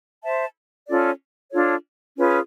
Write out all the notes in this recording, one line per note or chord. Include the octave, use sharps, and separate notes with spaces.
C5 E5 A5
C#4 F4 A4 D5
D4 F4 A4 C#5
C#4 F4 G#4 B4